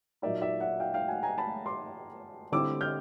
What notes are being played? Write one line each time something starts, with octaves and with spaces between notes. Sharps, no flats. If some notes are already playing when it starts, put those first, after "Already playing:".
A#2 F#3 A#3 D#4 D5 E5
D5 E5
E5 F#5
F5 G5
F5 G5
F#5 G#5
G#5 A#5
A5 B5
C6 D6
D3 G3 C4 E4 D6 E6
F6 G6